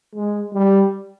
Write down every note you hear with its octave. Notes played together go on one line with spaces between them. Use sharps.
G#3
G3